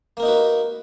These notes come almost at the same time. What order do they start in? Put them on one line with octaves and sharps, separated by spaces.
A#3 A#4 D#4 F#4 B4